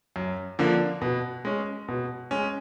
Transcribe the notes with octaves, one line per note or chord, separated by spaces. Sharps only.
F#2
D3 F3 A#3
B2
G#3 C#4
B2
G#3 C#4